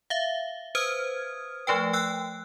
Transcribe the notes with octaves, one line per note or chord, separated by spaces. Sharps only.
E5 F5
B4 C5 D#6 F6 G#6
F3 A3 B4 G5
G5 E6 F#6